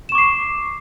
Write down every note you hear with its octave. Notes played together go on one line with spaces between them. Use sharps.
C#6 D6 C7 E7